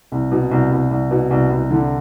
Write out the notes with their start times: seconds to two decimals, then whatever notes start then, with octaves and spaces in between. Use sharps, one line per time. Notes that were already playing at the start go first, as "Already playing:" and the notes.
0.12 C2
0.31 B2
0.51 C2
0.71 C2
0.91 C2
1.11 B2
1.30 C2
1.50 C2
1.71 D3